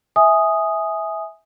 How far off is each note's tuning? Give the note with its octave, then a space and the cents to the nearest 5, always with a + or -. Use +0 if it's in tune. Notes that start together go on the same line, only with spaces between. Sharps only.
E5 -15 G#5 +0 D#6 +0